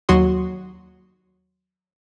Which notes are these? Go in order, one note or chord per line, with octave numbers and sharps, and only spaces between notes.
D#2 F#3 F#4 C6 D#6